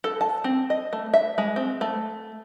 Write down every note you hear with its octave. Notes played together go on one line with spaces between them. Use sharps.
A4
A5
C4
D#5
A3
E5
G#3
C4
A3